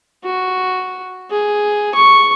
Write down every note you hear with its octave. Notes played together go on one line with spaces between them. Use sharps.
F#4
G#4
C#6